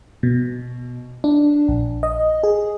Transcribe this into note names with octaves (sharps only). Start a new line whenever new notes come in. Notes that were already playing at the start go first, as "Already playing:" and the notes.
B2
D4
A#1
D#5
G#4